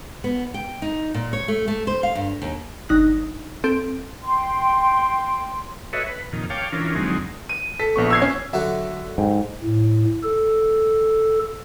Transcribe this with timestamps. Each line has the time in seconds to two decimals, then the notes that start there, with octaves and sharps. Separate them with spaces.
0.24 B3
0.54 G5
0.82 D#4
1.14 A#2
1.33 C#5
1.48 A3
1.68 A3
1.87 C5
2.03 F5
2.15 G2
2.42 D#2
2.89 G1 D#4 F#6
3.64 C4 A4 D7
4.22 G5 C6
5.93 F#4 A4 B4 C#5 D#5 E5
6.06 B4
6.33 F2 A#2 D#3
6.50 C#5 F5 G5 A5 D6
6.72 E3 C#4 D4 F4 A#4
6.95 F2 D3 F#3 G#3 C4 D#4
7.49 D#7
7.79 A4 B6
7.96 A#1 B3 C#6
8.10 E6 G#6 C7
8.22 C#4
8.53 D3 F#3 F#4 E5
9.18 G#2 G5
9.63 A2
10.23 A4